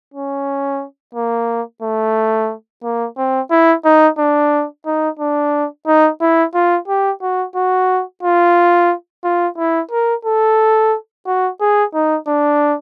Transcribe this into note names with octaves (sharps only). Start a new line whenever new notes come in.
C#4
A#3
A3
A#3
C4
E4
D#4
D4
D#4
D4
D#4
E4
F4
G4
F#4
F#4
F4
F4
E4
A#4
A4
F#4
G#4
D#4
D4